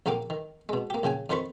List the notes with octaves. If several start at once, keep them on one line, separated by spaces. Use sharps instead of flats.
A#1 D3 A#3 F5 G5 D6
D#3
B2 G#3
A#3 G4
A#1 C#3 G5 G#5
F2 D#3 F4 C5 B5 C#6